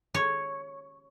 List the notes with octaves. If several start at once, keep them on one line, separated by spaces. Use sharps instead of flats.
C#5